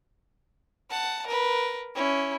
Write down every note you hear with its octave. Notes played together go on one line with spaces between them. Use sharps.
F#5 A5
A#4 B4
C#4 E4